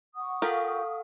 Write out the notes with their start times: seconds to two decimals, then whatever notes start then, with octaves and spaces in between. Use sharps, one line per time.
0.16 F#5 C#6 D#6
0.42 F4 G4 A4 A#4 F5